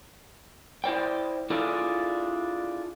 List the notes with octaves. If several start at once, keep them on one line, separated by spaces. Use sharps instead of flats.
E4 C5 D5 G5
D4 E4 F4 G#4 A4 D5